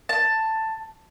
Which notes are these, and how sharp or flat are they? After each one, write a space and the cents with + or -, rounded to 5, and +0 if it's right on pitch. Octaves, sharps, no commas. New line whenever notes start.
A5 +10